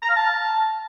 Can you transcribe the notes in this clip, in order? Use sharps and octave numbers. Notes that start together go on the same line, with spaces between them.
A#5
F5
A5